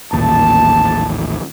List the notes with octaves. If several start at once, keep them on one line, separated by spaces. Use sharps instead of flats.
A1 D#2 A#2 A5